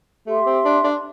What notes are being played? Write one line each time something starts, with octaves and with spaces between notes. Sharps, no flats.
A3 G4 E5 C6
C4
D4
D4